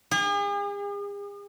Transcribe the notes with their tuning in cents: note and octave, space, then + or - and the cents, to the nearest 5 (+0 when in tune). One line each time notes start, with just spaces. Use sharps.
G#4 -45